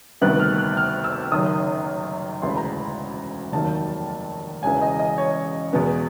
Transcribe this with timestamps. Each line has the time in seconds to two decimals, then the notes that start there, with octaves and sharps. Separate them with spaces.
0.21 D2 C3 D#3 G3 B3 F#6
0.40 F6
0.58 F#6
0.77 F6
1.04 E6
1.32 F#1 F#2 D#3 D#6
2.42 E1 D2 C#3 E3 C6
2.50 B5
2.57 A#5
2.64 B5
3.52 F1 D#2 D#3 F#3 A#3 A5
4.63 E1 E2 C#3 E3 G#5
4.81 D#5
4.99 D#5
5.18 C#5
5.73 E2 B2 G#3 B3